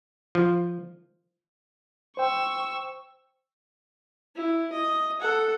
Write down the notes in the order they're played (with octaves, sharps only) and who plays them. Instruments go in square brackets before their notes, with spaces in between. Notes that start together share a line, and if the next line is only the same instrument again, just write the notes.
[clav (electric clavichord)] F3
[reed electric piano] C5 G5 [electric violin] C#6 E6
[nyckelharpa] E4
D#5
A4 F#5